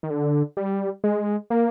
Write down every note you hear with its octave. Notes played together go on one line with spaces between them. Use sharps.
D#3
D3
G3
G#3
A#3